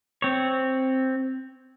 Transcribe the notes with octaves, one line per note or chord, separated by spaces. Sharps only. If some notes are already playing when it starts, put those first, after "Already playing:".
C4 C#5